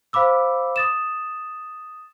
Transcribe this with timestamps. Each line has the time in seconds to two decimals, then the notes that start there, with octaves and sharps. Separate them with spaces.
0.13 C5 F5 B5 D6 E6
0.76 D#6 A6 E7